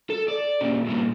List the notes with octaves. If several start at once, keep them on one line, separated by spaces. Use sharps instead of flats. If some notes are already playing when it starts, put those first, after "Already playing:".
A4
D5
A#2 C#3
G2 A#2